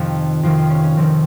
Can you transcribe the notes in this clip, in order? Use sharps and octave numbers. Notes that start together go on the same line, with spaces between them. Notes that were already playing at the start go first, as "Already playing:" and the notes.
Already playing: F2 C3 D#3 F4
F2 C3 D#3 F4
F4
C#4
C#4
F2 C3 D#3 C4